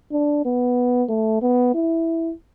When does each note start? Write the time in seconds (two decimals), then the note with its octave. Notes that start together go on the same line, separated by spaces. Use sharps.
0.12 D4
0.45 B3
1.09 A3
1.42 B3
1.74 E4